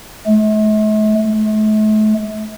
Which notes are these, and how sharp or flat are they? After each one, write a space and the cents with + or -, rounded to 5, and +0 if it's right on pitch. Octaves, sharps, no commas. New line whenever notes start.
A3 -45
A3 -40